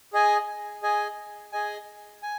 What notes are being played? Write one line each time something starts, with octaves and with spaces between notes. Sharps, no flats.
G#4 D#5 G#5
G#4 D#5 G#5
G#4 D#5 G#5
G#5